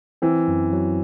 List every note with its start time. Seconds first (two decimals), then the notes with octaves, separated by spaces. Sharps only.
0.22 E3 C4
0.48 F#2
0.73 F#3